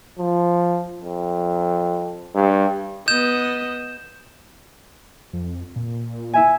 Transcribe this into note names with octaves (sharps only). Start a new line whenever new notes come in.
F3
F2
G2
B3 D#5 G6 E7
F2
A#2
E4 E5 G#5